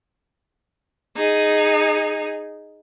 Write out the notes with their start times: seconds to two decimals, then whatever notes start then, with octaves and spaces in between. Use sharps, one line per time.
1.16 D#4 G#4